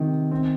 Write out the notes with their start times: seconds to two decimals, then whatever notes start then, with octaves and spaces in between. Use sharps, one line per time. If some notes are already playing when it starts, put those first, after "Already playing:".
Already playing: C3 D#3
0.31 C4